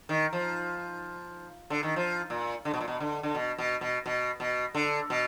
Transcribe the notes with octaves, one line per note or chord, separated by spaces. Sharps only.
D#3
F3
D3
D#3
F3
A#2
D3
B2
A#2
B2
D3
D3
B2
B2
B2
B2
B2
D3
B2